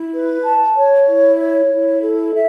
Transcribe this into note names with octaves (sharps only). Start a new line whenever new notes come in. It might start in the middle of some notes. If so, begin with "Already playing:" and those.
Already playing: E4
B4
A5
C#5
E4
C#5
E4
A4
E5